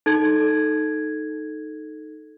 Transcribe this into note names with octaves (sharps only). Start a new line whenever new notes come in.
D#4 A4 G#6